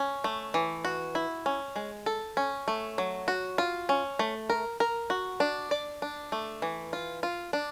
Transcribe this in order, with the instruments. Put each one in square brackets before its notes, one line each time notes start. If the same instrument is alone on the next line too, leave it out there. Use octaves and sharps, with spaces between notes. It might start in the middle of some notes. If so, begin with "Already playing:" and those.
Already playing: [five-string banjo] C#4
A3
E3
F#4
E4
C#4
G#3
A4
C#4
A3
F#3
F#4
F4
C#4
A3
A#4
A#4
F#4
D4
D5
D4
A3
E3
F4
F4
D4